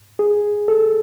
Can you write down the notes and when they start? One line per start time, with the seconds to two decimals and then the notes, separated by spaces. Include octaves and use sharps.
0.19 G#4
0.68 A4